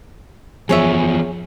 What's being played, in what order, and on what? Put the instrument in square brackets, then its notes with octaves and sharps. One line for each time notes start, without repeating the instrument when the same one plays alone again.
[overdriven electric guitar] E2 F3 [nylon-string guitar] G#4 C#5 E5